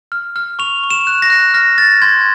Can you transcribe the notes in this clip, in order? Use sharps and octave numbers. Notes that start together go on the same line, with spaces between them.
F6
F6
C#6 F7
C#6
E7
F#6
A#6
F#6
F6 A#6
F6 A6
C6 G#6